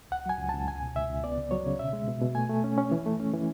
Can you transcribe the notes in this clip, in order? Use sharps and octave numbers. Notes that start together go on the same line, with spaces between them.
C#2 F#5
F#3 G#5
C#2
C#2 A5
C#2 G#5
B2
C#2 E5
C#2
B3 D5
C#3
F#3 C#5
C#3
B2 E5
G#3
B2
B2
A3 G#5
A3
C#4
C#4
E3
A3
C#4
E3